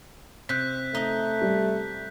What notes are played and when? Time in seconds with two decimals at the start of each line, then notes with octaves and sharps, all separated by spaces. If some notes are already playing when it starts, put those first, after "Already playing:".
0.49 C3 F#6 G6 B6
0.95 A3 D#4 D#5
1.42 G3